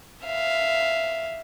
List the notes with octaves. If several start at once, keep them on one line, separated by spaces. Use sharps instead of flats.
E5 F5